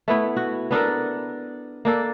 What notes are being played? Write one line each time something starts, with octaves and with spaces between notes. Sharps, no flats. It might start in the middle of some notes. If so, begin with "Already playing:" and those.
A3 B3 E4
F#4
B3 D4 A4 A#4
A#3 D4 A4